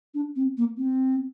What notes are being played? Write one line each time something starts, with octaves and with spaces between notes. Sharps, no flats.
D4
C4
A#3
C4